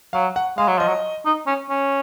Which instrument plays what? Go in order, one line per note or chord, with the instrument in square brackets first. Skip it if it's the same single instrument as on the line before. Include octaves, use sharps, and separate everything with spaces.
[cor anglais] F#3 [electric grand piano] F5
[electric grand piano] F#5
[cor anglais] G#3 [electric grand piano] F5
[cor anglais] F#3
[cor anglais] F3 [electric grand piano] D#5
[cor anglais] F#3
D#4
C#4
C#4